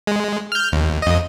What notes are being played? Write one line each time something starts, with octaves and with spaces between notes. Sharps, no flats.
G#3
F6 G6
D#2
F2 D#5